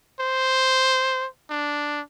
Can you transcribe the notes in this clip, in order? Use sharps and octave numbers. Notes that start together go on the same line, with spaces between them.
C5
D4